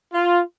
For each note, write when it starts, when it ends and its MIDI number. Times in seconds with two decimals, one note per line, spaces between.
0.14 0.40 65